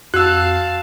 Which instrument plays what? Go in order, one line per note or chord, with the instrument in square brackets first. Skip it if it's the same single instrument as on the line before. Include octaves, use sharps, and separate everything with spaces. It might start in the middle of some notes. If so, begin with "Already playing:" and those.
[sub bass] F2 [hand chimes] F#4 [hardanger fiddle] F5 A5 [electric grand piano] E6 F#6